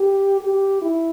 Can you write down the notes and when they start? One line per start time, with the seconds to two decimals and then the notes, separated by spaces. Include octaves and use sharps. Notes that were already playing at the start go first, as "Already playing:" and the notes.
Already playing: G4
0.41 G4
0.82 E4